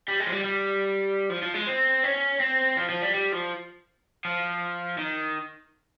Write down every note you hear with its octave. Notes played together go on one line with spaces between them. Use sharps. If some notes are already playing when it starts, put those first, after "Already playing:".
G3
G#3
F3
G3
G3
F3
F3
G#3
C4
C#4
C4
F3
F3
G3
G3
F3
F3
D#3